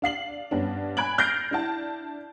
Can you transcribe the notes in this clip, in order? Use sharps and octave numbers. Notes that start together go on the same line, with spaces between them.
D4 F5 C7 F#7
G2 B3 C#4 D4
G#5 B5 F#6 G#6 D7 F#7
F6 G6 A6 A#6 C7 D7
D4 E4 A5